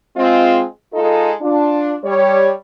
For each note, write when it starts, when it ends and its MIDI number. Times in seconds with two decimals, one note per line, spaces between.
0.17 0.63 56
0.17 0.63 60
0.17 0.63 65
0.94 1.32 56
0.94 1.32 63
0.94 1.32 65
0.94 1.32 69
1.41 1.96 62
1.41 1.96 65
2.04 2.49 55
2.04 2.49 73